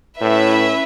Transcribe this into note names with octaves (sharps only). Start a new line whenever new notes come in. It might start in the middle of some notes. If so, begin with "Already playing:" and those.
A2 C#4 E4 B4 E5